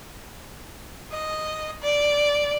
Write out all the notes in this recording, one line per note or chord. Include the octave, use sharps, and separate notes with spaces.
D#5
D5